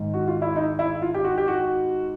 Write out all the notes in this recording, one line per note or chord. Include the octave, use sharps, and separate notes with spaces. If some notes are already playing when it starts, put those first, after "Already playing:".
Already playing: G#2 D#3
F#4
F4
E4
D#4
E4
F4
G4
F#4
G4
F#4